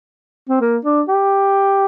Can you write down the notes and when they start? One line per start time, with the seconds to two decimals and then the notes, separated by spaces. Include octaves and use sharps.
0.49 C4
0.61 A#3
0.85 D4
1.08 G4